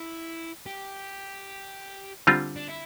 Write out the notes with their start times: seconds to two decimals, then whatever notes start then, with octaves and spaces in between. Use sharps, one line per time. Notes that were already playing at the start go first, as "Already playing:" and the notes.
Already playing: E4
0.66 G4
2.27 D3 G3 C4 F4
2.56 D4
2.68 E4